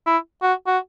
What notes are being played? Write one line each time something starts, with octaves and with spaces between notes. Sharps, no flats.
E4
F#4
F#4